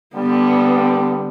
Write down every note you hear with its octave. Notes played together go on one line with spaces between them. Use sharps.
D3 G3 B3